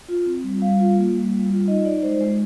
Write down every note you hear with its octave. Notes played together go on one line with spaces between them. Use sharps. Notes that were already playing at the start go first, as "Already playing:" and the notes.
F4
C4
G3
G3 F5
F4
A#3
G3
G3
F4
D#4 D#5
D#4 D5
G#3 C5
G#3